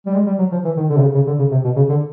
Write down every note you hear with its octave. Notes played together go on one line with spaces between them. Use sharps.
G3
G#3
G3
F#3
F3
E3
D#3
D3
C3
C#3
C#3
D3
C#3
C3
B2
C#3
D3